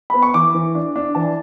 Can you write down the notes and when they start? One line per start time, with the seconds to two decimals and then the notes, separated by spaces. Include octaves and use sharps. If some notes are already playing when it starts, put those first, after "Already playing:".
0.10 B3 B5
0.22 C#6
0.34 E3 D6
0.54 E3
0.75 D4
0.96 D4
1.15 E3 A5